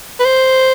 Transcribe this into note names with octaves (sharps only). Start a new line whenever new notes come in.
B4
C5